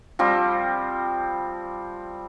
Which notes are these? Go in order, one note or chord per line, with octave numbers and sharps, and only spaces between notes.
F3 G3 C4